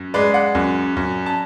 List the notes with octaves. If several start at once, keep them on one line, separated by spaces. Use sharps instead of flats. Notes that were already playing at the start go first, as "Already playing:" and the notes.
Already playing: F#2
G#3 B4 D5
D5 F#5
F#2
F#2
A5